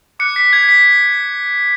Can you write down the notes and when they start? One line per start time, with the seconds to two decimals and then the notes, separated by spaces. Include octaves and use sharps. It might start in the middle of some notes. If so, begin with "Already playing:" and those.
0.19 D6 F#6 C#7
0.36 B6
0.53 G#6
0.69 B6